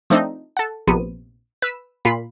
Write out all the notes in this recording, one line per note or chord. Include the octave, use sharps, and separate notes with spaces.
F3 A3 C4 D4 D#4
A4 F#5
A#1 C3 B3 D#7
B4 E6 E7
A#2 F4 B5 C7